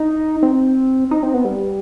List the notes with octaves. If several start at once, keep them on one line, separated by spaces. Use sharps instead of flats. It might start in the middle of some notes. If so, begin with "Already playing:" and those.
Already playing: D#4
C4
D#4
C4
B3
G3